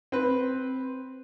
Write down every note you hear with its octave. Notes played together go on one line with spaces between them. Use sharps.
C4 B4